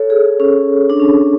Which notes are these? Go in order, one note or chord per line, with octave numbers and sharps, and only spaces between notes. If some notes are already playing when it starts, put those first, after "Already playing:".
Already playing: A4 C#5
G#4
C#4
D4
C#4